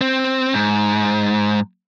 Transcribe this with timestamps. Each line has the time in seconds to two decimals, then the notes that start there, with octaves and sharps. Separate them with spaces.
0.01 C4
0.54 G#2